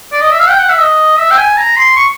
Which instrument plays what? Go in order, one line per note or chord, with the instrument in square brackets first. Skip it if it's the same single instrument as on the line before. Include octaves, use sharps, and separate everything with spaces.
[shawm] D5
D#5
E5
F5
G5
F#5
E5
D#5
E5
G5
G#5
A#5
C6
C#6